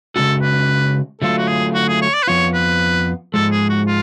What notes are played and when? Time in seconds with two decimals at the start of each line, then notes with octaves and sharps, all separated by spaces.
0.15 C#3 G#3 C#4 F#4 A4
0.42 B4
1.21 D3 F#3 A3 F4 A4
1.38 F#4
1.47 G#4
1.74 F#4
1.88 G#4
2.02 C#5
2.14 D5
2.23 B4
2.27 F2 F3 B3 F4 C#5
2.54 B4
3.34 G#2 F3 G#3 A4
3.52 G#4
3.69 F#4
3.87 F4